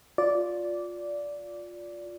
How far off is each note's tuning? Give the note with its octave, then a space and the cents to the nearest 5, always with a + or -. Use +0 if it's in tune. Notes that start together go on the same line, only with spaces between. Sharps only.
F4 +15 D5 -10